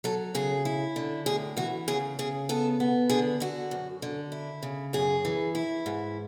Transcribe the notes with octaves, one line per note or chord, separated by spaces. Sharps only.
F#3 A4
C#3 G#4
E4
D3
A2 G#4
E3 F#4
C#3 G#4
C#3 G#4
B3 A4
B3
D3 G#4
D3 F#4
F#2
D3
E4
C#3
F#2 G#4
E3
E4
G#2